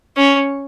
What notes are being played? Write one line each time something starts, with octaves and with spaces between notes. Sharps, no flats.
C#4